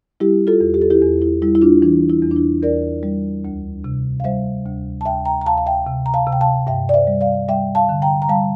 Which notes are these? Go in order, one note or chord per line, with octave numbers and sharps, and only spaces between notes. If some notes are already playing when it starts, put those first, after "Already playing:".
G3 E4 G4
F4 A4
E2
G4
A4
E4 G4
E2
E4
G3 E4
E4
D4 F4
E3 D4
E4
E2
D4
E4
E2 A#4 D5
G3
D2
C3
F5
G3 C5 E5
D2
A5
D2 E5 G5
G5 A#5
A#5
D2 F5 A5
F5
E5 G5
C3
A#5
F5 A5
C3
G5
F5 A5
G2 E5 G5
D5
C5 E5
G3
D5 F5
G3 E5 G5
F5 A5
D3
G5 A#5
A#5
G3 F5 A5